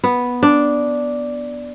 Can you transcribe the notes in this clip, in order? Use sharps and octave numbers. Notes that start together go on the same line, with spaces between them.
B3
D4